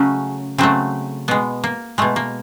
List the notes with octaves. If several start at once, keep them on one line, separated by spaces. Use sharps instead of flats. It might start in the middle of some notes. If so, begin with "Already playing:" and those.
Already playing: C#3 F#3 A3 C#4
C#3 F#3 A3 C4
B2 G#3 B3
A#3
B2 G#3 A3
A#3